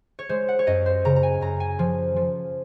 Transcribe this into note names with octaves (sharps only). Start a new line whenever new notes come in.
C#5
G#3 C5
F#5
C#5
F#2 D#5
C5
C#3 A#5
A#5
G#5
F#2 A#5
G#5
F3
F3